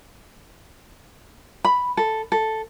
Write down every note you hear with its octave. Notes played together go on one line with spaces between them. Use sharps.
B5
A4
A4